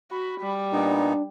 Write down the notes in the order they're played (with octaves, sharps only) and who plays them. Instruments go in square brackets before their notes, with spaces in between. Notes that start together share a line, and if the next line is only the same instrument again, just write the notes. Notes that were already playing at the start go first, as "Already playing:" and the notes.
[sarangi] F#4 [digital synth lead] B5
[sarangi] G3
[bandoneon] A#2 B3 D#4 [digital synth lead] D4